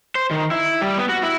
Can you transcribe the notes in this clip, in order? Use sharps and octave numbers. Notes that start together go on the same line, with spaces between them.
C5
D#3
E4
G3
B3
F#4
E4